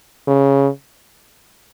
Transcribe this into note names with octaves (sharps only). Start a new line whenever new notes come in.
C#3